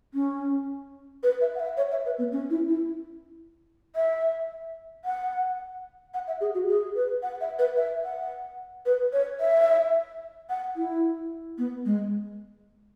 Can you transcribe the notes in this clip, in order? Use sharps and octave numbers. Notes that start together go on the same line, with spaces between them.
C#4
B4
E5
F#5
E5
C#5
E5
B4
B3
C#4
E4
E4
E5
F#5
F#5
E5
G#4
F#4
G#4
B4
F#5
E5
B4
E5
F#5
B4
C#5
E5
F#5
E4
B3
G#3